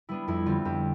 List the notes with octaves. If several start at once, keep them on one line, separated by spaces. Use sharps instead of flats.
G3 B3 D4 E4
F2 E4
D3 G3 C4 F4
F2 G4